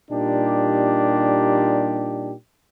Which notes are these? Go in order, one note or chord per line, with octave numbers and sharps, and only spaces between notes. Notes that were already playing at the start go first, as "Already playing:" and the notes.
A#2 G3 D4 D#4 G4